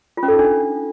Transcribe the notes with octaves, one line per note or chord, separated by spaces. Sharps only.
F4
C#4
A4
D#4
D4